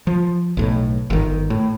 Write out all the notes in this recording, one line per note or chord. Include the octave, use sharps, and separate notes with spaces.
F3
B1 A2
G1 D#3
A2